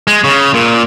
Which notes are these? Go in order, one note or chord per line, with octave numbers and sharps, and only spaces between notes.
G#3
C#3
A#2